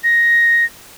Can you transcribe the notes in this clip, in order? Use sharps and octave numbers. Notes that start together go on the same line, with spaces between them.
A#6